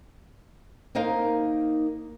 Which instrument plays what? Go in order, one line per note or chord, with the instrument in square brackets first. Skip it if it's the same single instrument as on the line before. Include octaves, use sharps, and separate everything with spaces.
[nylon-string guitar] A#3 D#4 A#4 C5 F5